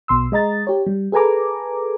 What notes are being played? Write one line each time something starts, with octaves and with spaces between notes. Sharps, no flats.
B1 B2 C6 E6
G#3 D#5 A#5 A6
G4 C#5
G3
G#4 A4 B4 G#5 A#5 D6